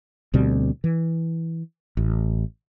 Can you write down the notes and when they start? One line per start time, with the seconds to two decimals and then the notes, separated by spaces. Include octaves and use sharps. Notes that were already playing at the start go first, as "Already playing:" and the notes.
0.34 D2 B2 G3 C4
0.84 E3
1.97 A1